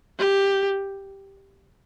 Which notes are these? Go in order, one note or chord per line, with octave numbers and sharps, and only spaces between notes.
G4